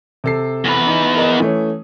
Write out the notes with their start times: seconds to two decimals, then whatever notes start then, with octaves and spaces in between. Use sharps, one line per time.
0.24 C3 A4 C7
0.65 E2 B4
0.87 D#4
1.16 A#4 D#5 D#6
1.40 E3 A3 C#4